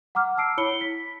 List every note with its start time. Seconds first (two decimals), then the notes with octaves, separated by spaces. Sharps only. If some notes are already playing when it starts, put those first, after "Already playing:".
0.15 F#5 A#5 D6 F6
0.37 A5 E6 C7 D7
0.58 E4 C#5 B5 C#7 G7
0.81 B6